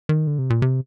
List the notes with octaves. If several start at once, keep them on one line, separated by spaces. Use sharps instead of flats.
D#3
D3
C3
A#2
C3